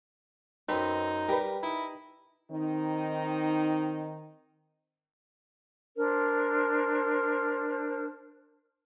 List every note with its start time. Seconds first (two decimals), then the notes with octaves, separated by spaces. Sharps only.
0.69 F#2 C4 D#4 B4
1.29 G3 G4 A#4 B4
1.63 D#4 E4
2.51 D#3 C4 D#4
5.96 D4 A#4 C5